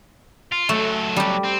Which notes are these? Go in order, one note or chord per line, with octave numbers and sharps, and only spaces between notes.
F4
F#3 A3 A4
G3 G4
C4